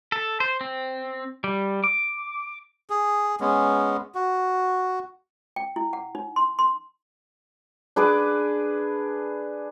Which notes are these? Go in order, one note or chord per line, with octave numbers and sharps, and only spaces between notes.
A4
C5
C4
G3
D6
G#4
G#3 B3 C#4
F#4
G5
E4
F#5
D#4
C6
C6
D4 G#4 B4 D6